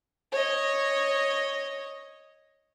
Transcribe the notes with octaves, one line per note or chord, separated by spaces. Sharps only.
C#5 D#5